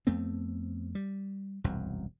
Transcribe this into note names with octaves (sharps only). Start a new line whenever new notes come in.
F2 A3 B3 C4
G3
E1 C2 F#2